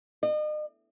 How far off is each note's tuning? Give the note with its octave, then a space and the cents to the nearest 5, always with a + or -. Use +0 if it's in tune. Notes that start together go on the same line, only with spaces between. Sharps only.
D#5 -40